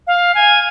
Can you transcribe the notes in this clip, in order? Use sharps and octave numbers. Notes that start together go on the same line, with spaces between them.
F5
G#5